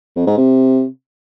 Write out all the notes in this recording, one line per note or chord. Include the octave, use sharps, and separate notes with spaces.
F2
G#2
C3